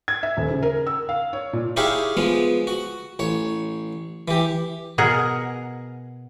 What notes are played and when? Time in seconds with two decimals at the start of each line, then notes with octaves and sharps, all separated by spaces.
0.08 G#6
0.23 E5
0.37 D#1
0.51 C#3
0.62 A#4
0.87 E6
1.09 F5
1.33 C#5
1.53 A#2
1.77 D#4 E4 G4 G#4 C#5 F5
2.17 F3 G#3 B3
2.67 F#4
3.19 A1 C#5
4.28 E3 G4
4.98 B2 G#4 A#4 F#5